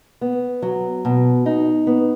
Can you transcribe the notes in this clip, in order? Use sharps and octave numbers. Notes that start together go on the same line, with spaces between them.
B3
F#3
B2
D#4
B3